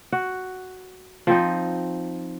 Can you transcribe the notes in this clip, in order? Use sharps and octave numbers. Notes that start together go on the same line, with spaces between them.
F#4
F3 C4 D#4